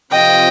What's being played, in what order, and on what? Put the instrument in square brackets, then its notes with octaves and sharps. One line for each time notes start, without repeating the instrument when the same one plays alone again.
[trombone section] C3 F3 C4 F4 [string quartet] D#5 G5